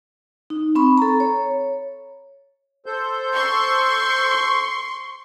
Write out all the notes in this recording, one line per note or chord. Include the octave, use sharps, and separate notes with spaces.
D#4
C4 B5 C#6
A4 A#5
C#5
A4 C5 G6
C6 C#6